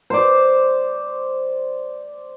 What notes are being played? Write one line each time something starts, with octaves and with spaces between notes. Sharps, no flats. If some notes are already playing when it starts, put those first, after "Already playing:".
C5 D5